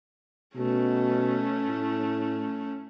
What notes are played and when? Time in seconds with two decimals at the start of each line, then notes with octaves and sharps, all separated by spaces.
0.56 B2 A3 C#4
1.66 A2